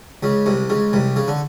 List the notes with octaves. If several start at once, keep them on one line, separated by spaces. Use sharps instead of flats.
C#2 C#3
C2 C3
C#2 C#3
C2 C3
C#3
D3